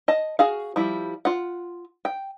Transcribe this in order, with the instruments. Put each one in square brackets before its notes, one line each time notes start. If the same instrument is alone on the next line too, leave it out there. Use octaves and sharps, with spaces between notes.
[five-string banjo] D#5 A5
F#4 G#4 F5
F3 G3 E4
F4 F#5
G5